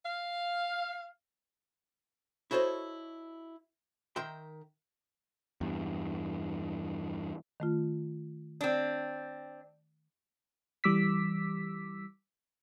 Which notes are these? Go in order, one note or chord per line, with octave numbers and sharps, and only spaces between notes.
F5
E4 F#4 A4 C5 C#5 D#5
D#3 A#4 E5 G5 C6
E2 G2
D#3 A3 F4
C4 D4
E3 G3 D6 E6 B6